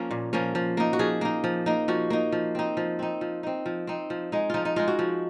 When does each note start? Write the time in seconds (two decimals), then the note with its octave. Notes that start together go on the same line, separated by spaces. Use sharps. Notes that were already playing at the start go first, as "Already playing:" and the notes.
Already playing: F3 A#3 C#4
0.11 A#2
0.33 F3 A#3 C#4
0.55 F3
0.77 A#3 D#4
0.93 F#4
0.99 F3 G#4
1.21 A#3 D#4
1.44 F3
1.66 A#3 D#4
1.88 F3 F#4
2.10 A#3 D#4
2.32 F3
2.55 C4 D#4
2.77 F3
2.99 C4 D#4
3.21 F3
3.43 C4 D#4
3.66 F3
3.87 C4 D#4
4.10 F3
4.32 G#3 D#4
4.50 F3 D#4 F4
4.65 D#4
4.76 G#3 D#4 F4
4.88 F#4
4.99 F3